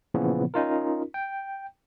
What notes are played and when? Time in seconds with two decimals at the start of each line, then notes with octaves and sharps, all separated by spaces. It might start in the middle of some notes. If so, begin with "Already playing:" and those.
0.14 A#2 C#3 E3 F3 B3
0.54 C#4 D#4 F4 A#4
1.14 G5